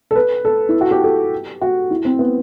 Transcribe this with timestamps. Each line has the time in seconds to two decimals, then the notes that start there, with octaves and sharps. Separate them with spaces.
0.11 A4
0.15 B4
0.45 A4
0.69 E4
0.81 F#4
0.91 G4
1.04 A4
1.62 F#4
1.91 E4
2.05 C4
2.19 B3